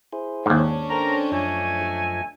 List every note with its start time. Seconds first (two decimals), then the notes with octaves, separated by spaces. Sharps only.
0.13 E4 G#4 C5
0.46 D#2 G#2 C#4 D4
0.90 A4 A#4 C5 G5 A#5
1.32 F#2 F3 A3 D#5 G#5